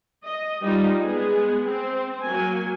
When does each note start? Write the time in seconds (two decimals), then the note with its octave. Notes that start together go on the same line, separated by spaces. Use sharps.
0.25 D#5
0.62 G3 D#4 F4
0.99 G#3 B3 G#4
1.66 C4
2.23 F#3 A#3 G#5